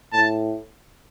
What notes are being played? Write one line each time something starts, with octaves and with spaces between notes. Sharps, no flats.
A2 A5